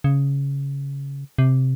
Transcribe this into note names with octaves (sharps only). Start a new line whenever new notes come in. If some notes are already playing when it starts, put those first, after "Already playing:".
C#3
C3